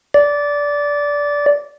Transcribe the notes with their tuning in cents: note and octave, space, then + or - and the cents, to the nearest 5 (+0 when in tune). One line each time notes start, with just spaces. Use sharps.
D5 -15